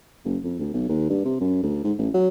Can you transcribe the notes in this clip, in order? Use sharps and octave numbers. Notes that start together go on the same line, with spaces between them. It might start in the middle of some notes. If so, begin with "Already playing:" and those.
F#1
F2
D2
B1
D#2
G2
C3
F#2
D2
G#2
A1
F#3